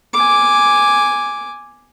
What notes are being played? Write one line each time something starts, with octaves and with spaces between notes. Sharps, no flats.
G#5 D6